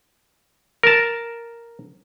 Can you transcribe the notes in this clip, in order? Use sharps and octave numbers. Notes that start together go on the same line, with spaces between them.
A#4 A5